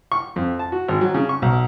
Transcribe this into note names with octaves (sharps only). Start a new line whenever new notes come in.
C#6
F2
A5
F#4
G#1
F#3
C#3
C#6
B1